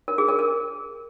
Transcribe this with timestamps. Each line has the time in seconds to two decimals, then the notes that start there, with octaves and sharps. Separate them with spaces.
0.08 A#4
0.18 G#4
0.29 A#4
0.39 A#4